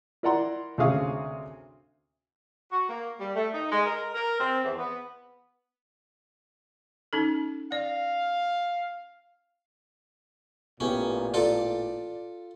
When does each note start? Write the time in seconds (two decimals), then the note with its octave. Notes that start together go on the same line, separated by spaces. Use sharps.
0.23 E4 A#4 D5 F#5 A#5 C6
0.78 D2 C3 C#4 G#4 F5 D#6
2.72 F#4
2.89 A#3
3.20 G3
3.36 A3
3.54 D#4
3.71 G#3
3.86 A#4
4.15 A#4
4.40 C4
4.65 E2
4.77 B3
7.13 C#4 D#4 A4
7.72 D5 F5
10.80 A1 A#2 B3 C#4 G4 B4
11.34 F4 A4 D5